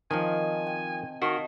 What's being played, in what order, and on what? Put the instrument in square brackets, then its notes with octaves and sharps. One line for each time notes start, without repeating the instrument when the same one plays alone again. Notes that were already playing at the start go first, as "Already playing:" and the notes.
[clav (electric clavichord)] D#3 F3 [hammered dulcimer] C4 D#5 A5 [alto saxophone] G#5
[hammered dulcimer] G5
[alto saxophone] D#3 [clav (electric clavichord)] F#4 [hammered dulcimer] D#5 F5 A5